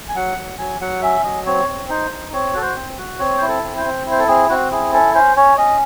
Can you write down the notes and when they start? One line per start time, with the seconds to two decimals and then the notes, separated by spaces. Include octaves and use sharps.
0.09 G#5
0.15 F#3 F#5
0.38 F#3
0.59 F#3 G#5
0.80 F#3 F#5
1.02 C#4 E5
1.24 F#3 D#5
1.46 C4 C#5
1.68 C4
1.89 D#4 C5
2.11 D#4
2.33 C4 C#5
2.54 F#4 A4
2.62 C5
2.75 C4
2.98 F#4
3.19 C4 C#5
3.38 E4 C5
3.48 A4
3.63 C4
3.77 C5
3.85 C4
4.06 E4
4.11 C5
4.19 A4
4.28 C4 G#4
4.49 C4 F#4
4.71 E4 G#4
4.93 C#4 A4
5.14 C#4 C5
5.36 C#4 C#5
5.57 C#4 D#5